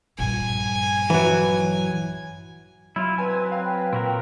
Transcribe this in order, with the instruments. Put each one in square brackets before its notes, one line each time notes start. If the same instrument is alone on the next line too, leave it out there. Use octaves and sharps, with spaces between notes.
[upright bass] A#1 G2 [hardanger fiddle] G#5
[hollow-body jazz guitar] E3 F#3
[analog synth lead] F#3 [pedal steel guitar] E4 F4
[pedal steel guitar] F#3 C4 [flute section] B4 [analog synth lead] G#5
[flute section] B4 G5 [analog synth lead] F5
[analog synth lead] A#2 [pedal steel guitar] C4 F#4 A#4